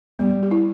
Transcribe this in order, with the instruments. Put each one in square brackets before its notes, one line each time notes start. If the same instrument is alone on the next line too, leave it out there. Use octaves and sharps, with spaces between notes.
[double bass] G3 [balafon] B3
[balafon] G4
E4